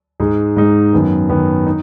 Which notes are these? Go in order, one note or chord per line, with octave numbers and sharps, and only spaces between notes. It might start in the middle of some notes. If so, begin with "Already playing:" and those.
G#2 G#3 D#4
G#2 G#3 D#4
F#2 D#3 B3
F#2 D#3 B3
D#4